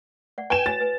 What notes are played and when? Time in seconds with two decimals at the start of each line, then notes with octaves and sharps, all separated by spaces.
0.38 D5 F#5
0.50 B4 G5 G#5 E7
0.66 F#4 C#5 G#5 A6
0.81 B4 G#5